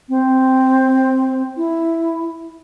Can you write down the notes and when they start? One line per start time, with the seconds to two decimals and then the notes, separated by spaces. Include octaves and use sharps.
0.09 C4
1.57 E4